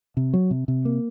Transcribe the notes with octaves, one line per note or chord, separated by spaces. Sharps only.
C3
F#3
C3
C3
A#3